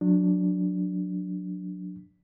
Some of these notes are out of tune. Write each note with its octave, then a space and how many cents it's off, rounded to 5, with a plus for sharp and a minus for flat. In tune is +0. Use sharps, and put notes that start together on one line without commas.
F#3 -25 D4 +0